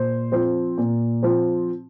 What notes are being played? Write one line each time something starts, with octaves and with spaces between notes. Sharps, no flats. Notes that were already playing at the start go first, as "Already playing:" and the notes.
Already playing: A#2 C5
F3 C4
A#2
F3 C4